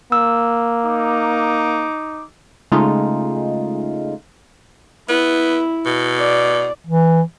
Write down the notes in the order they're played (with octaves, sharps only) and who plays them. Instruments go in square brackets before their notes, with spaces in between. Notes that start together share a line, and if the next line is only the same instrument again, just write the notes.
[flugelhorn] A#3 [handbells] E6
[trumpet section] D#4 D6
[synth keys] C#3 G#3 A3 D#4 F4
[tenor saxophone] B3 [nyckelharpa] E4
[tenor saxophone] B2
[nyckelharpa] D5
[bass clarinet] E3